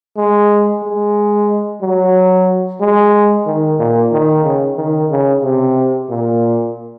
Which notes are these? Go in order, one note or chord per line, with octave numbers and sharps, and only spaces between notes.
G#3
G#3
F#3
G#3
D#3
A#2
D#3
C#3
D#3
C#3
C3
A#2